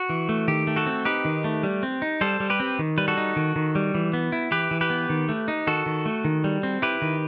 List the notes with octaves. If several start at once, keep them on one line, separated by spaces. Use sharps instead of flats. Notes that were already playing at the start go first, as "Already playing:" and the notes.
Already playing: F#4
E3
A3
D#3 G4
A3
F#4 A4
C4
D#4 G4 B4
D#3
A3
G3
C4
D#4
G3 A4 C5
G3
G4 B4
C4
D#3
G3 B4
F#4 A4
D#4
D#3
D#3
G3
E3
B3
E4
E3 G4 B4
E3
G4 B4
B3
D#3
A3
D#4
D#3 F#4 A4
D#3
A3
D#3
G3
C4
E4 G4 B4
D#3